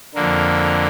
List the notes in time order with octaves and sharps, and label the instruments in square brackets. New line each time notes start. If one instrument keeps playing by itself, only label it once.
[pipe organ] F2 D3 A#3